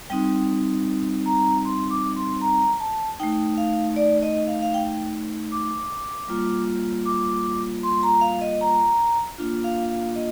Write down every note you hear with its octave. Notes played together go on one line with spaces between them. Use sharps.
G3 C4 D#4 G5
A#5
C6
D6
C6
A#5
A5
A3 D#4 G5
F5
D5
D#5
F5
F5
G5
D6
G3 A#3 F4
D6
C6
A#5
F5
D#5
A#5
A#3 D4 F4
F5
F5
D#5